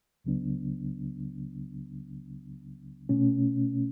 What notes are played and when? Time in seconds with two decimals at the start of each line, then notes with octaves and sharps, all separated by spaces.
0.24 C#2 C#3 F#3 B3 D4
3.09 B2 A3 C#4